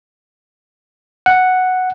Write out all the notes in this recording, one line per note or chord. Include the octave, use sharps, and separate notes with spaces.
F#5